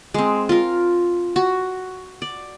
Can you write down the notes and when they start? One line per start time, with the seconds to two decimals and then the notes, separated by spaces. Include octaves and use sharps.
0.14 G#3 C4
0.49 F4 A#4
1.36 F#4
2.22 D5